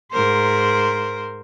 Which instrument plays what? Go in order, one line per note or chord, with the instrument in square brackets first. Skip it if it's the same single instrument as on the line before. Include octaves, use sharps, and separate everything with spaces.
[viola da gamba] G#2 A#4 C5